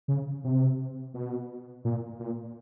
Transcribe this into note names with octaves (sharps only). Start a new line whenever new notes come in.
C#3
C3
B2
A#2
A#2